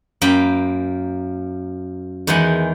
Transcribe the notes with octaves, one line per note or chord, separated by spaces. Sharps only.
F#2 A#3 F5 G5 B5
E2 D#3 E3 G#3 F#5 G#5